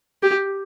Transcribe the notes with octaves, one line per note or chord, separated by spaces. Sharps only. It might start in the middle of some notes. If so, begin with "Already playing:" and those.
G4